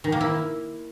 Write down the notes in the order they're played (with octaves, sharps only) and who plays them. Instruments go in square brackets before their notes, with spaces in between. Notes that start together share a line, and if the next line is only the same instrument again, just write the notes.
[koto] D#3
A#3
E4